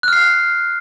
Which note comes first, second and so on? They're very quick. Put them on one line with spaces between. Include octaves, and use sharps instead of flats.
F#6 F6 C7